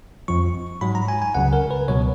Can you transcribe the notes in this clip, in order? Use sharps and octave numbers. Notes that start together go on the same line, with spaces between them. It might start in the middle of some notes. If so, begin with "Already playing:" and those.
F2 F3 C#6
G#2 F#3 B5
A#5
G#5
G#5
C#2 C#3 F#3 F#5
A#4
B4
C#2 B2 F#3 C#5